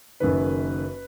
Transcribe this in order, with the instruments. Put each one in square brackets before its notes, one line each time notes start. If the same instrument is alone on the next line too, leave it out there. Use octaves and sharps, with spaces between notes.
[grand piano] F#1 F#2 D#3 B4